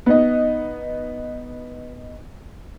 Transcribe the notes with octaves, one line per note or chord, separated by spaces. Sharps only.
B3 D#4 D#5